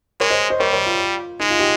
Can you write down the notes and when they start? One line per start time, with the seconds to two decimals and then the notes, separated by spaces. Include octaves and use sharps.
0.20 G#3 A#4 C#5
0.30 C5 D#5
0.50 C5 D#5
0.60 G3 A#4 C#5
0.73 A#4 C#5
0.86 F4
1.40 G#3 D#4
1.50 F4
1.59 D#4 G4